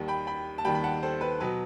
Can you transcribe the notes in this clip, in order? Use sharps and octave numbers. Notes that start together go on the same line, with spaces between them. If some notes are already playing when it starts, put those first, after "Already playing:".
Already playing: D#2 D#3 G3
G5 B5
G5 B5
A5
D#2 D#3 G3 G5 B5
B5
F#5 A5
A4 C5
B4
B2 F#3 B4